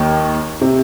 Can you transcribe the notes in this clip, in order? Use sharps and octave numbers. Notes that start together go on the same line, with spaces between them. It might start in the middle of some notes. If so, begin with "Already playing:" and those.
Already playing: D#2 D#3 A#3
C3